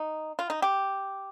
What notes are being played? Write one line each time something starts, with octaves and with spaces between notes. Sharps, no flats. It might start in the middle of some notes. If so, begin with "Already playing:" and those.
Already playing: D#4
F4
D#4
G4